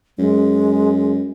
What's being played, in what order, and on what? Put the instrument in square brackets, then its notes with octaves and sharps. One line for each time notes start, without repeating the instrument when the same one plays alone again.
[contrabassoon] F#2 [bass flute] G#3